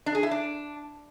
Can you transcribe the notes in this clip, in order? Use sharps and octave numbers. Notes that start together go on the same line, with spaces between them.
D4
G#4
E4
D4